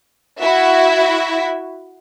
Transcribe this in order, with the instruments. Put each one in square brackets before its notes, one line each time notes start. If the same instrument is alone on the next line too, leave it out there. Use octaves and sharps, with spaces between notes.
[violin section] E4 F#4 E5